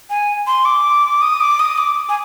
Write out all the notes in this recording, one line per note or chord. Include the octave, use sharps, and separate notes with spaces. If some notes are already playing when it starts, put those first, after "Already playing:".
G#5
C6
D6
D#6
D6
D#6
D6
G#5